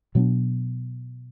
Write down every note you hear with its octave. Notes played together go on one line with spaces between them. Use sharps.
B2 F#3 B3 D4